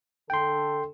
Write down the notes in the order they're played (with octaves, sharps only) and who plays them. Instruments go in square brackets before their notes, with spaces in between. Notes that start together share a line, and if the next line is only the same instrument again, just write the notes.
[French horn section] D3 A4 [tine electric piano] G5 C6